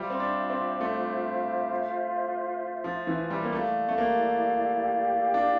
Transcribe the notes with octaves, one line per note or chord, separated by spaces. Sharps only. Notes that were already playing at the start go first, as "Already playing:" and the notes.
Already playing: G3 F4 C5 E5
C4
D4
C4
A3
F3
E3
G3
A#3
A3 E4 G4 D5 F5
A3
A#3
D4